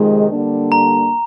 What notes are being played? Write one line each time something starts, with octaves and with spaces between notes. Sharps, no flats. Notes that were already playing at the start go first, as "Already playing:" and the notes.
Already playing: F2 C3 D#3 G#3 D#4
D3 G3 A#3 D4
A#5